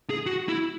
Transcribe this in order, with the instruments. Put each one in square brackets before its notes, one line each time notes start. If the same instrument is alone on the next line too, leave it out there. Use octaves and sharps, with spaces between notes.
[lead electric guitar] G#4
F#4
E4